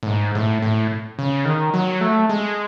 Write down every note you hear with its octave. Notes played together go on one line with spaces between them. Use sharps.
A2
G#2
A2
A2
C#3
D#3
F#3
A3
G#3